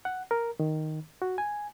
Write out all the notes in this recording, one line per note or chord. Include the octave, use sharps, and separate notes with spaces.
F#5
A#4
D#3
F#4
G#5